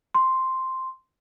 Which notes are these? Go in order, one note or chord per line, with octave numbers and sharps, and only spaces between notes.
C6